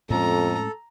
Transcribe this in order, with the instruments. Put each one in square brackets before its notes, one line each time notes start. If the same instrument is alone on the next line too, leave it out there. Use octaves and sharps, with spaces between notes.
[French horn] F2 [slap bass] A2 G#3 C#4 [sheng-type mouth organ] A4 [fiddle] A#5